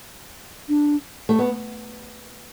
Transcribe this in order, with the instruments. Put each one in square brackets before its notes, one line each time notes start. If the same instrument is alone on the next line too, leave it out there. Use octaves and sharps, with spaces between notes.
[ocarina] D4
[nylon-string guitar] A3
B3